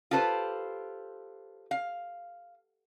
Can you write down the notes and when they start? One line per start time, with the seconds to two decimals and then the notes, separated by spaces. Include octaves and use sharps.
0.11 F4 G4 A4 B4 C5
1.71 F5